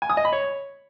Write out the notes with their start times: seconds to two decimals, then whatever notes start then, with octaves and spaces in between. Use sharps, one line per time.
0.02 G#5
0.10 D#6
0.17 D#5
0.25 B5
0.32 C#5